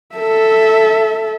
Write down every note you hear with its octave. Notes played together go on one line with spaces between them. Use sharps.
A4 E5